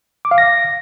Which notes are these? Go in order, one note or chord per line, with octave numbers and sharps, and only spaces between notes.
D6
F5
A#6